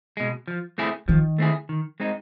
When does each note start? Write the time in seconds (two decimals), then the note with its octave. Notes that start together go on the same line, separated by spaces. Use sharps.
0.17 B2 G#3
0.48 F3
0.78 A3 C4 E4 G#4
1.08 D#3 F3
1.38 A3 C4 E4 G#4
1.69 D#3
2.00 G#3 C4 D#4